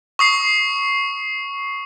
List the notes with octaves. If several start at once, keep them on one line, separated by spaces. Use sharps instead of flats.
C#6 D#6 C7